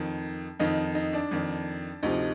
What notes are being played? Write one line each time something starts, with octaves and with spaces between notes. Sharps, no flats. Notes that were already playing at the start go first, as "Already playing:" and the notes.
Already playing: F2 D#3
F2 D#3 D#4
D#4
D4
F2 D#3
D2 C3 F3 D#4